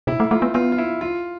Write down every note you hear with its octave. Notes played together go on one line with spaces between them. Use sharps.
B2 E4
A3
A3 F4
B3
B3 F4
F4
E4
F4